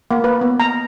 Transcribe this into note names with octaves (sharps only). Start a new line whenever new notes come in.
A#3
B4
B3
A#5